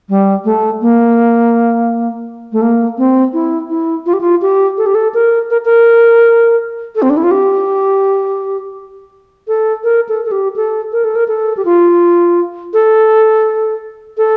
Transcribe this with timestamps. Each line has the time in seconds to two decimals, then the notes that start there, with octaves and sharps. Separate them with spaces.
0.09 G3
0.45 A3
0.82 A#3
2.52 A3
2.62 A#3
2.98 C4
3.33 E4
3.70 E4
4.06 F4
4.13 G4
4.21 F4
4.42 G4
4.78 A4
4.86 G4
4.95 A4
5.14 A#4
5.50 A#4
5.65 A#4
6.96 A4
7.02 C4
7.10 D4
7.17 E4
7.23 F4
7.31 G4
9.48 A4
9.84 A#4
10.09 A4
10.25 A4
10.32 G4
10.56 A4
10.93 A#4
11.04 A4
11.15 A#4
11.28 A4
11.57 G4
11.65 F4
12.74 A4
14.18 A4